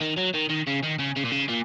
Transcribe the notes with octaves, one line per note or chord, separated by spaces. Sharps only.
D#3
F#3
D#3
D#3
C#3
D#3
C#3
C#3
A#2
C#3
A#2